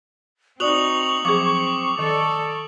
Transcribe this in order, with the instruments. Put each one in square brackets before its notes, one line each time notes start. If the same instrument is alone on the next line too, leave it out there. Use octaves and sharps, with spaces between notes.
[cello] C4 D#4 [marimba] F#4 D5 [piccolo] C#6 [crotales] D#6 F7 F#7
[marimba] F3 F#3 G#4 [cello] C4 [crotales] D6
[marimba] D#3 [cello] A4 D5 [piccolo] C#6